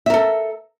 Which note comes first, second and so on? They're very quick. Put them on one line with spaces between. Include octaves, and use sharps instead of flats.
E5 A#4 A4